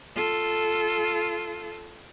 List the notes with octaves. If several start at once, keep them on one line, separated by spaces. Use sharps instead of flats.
F4 A4